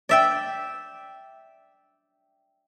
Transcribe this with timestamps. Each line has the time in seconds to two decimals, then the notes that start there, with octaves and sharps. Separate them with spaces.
0.09 D5 E5 G5